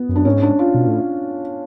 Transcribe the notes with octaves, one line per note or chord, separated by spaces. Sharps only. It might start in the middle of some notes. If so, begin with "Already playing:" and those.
Already playing: B3
F#2
D4
G#2 C#4
D4
F4
B2
A2